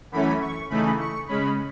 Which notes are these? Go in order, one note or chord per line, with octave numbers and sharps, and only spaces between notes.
F#2 E3 A3 C#4 B5
C#6
C#3 E3 A3 D#4 B5
C#6
C#3 G#3 C#4 B5